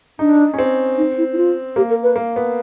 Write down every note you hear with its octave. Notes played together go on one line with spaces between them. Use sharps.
D4 D#4
C#4
C4
D#4
E4
E4
F4
A#3 G4
A#4
B4
A#3
B3